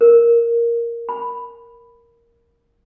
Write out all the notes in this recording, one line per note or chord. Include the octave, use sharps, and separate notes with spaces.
A#4
B5